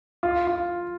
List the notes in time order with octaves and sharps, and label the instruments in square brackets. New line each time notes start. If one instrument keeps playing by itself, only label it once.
[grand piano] F4
F4